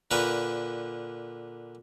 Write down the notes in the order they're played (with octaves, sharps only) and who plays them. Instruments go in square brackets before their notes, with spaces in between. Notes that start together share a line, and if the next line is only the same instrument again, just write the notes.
[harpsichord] A#2 D3 A#4 B4 C#6